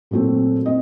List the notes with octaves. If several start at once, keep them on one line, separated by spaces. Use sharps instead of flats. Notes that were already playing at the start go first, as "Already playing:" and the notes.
A#2 F#3 A3 C4
C4 D#5